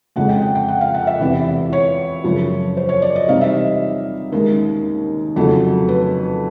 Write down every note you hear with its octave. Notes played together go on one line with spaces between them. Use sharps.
F2 C#3 F3 G#3 F#5
G5
G5
G5
F#5
F5
F#5
E5
E2 C3 E3
C#5
F#2 C#3 F3
C5
C#5
D5
D#5
C3 E3 G3 C4 D#4 F5
E5
D#5
D#2 D#3 G#3 C#4 A#4
F2 C#3 F#3 A3 C#4
B4